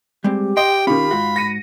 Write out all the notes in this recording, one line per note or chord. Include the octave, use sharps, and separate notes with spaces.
G3 G#3 C4 G4
D#5 G5 C6
D#3 C#4 F4 B5
G#2 F4 F#4
A#6 C#7 D#7